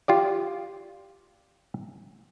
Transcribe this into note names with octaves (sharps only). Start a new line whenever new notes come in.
F4 G4 D5